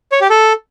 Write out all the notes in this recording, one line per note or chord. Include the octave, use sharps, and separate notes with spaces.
C#5
G4
A4